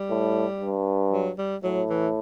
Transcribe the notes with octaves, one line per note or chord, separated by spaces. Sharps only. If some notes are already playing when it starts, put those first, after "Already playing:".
Already playing: G3
A2
G2
F#3
G3
A2 F#3
E3